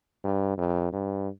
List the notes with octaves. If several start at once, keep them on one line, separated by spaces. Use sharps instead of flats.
G2
F2
G2